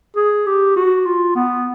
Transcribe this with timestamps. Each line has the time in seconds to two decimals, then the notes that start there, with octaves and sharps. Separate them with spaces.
0.16 G#4
0.46 G4
0.76 F#4
1.06 F4
1.35 B3